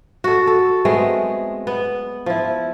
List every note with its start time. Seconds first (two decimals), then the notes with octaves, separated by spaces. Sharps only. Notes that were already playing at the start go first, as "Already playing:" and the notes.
0.24 F#4 A4
0.47 A4
0.85 G#3 A3 B3 C4
1.67 B3
2.26 F3 E4